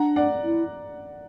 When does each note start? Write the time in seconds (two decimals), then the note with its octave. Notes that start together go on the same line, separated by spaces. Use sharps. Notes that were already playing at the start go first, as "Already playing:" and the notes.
Already playing: D4 F#5 A#5
0.16 D5 F#5
0.44 E4